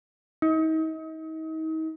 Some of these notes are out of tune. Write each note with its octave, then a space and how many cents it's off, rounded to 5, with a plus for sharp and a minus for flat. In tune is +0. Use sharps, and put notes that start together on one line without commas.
D#4 +40